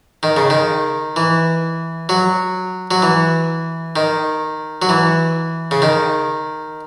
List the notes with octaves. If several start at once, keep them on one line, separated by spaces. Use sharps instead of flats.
D#3
C#3
D#3
E3
F#3
F#3
E3
D#3
F#3
E3
C#3
D#3